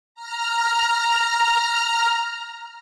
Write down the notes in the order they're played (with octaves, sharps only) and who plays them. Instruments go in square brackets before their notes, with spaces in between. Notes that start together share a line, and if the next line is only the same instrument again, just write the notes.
[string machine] A#5 F6